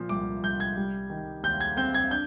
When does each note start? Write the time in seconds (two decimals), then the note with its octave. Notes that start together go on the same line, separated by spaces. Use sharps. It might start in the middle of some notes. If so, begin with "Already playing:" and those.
Already playing: A#2 F3
0.09 C2 D6
0.43 C2 G6
0.60 G#6
0.77 G3
1.10 D#3
1.43 D#2 G6
1.61 G#6
1.77 C4 G6
1.94 G#6
2.11 D4 G6